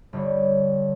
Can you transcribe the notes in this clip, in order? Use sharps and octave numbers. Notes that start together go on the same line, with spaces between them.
G1 D3 G3 C#5